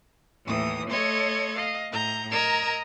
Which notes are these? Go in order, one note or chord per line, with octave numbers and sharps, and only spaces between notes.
D#2 A2 E3 D#6
A3 A4 C#5 D#5 C6 G#6
D#5 F5
A2 A#5 G6
A#4 D#5 A#5 E6 G#6